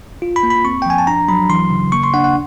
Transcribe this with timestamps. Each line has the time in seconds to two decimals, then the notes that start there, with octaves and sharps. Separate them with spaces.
0.22 F4
0.36 B5
0.43 A#3
0.50 B5
0.65 C4 C#6
0.82 G5
0.86 F3 G#5
0.98 A5
1.07 D4 A#5
1.28 F#3 B5
1.49 E3 C6
1.70 C#3
1.92 A#3 C#6
2.04 C6
2.14 D4 F#5
2.24 F#5